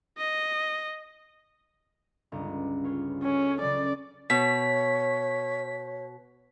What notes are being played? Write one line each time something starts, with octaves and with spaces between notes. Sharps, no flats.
D#5
G1 C#2
F4 B4 C#5
C#4 F#4 A4
C#3 F#3 D5
B2 C#5 B6